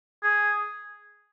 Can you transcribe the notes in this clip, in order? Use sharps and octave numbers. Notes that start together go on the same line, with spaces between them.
G#4